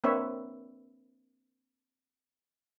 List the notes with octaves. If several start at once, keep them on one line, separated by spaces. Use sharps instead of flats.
A#3 C4 D4 B4 C#5 E5